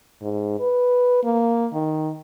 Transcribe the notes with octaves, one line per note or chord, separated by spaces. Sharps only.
G#2
B4
A#3
D#3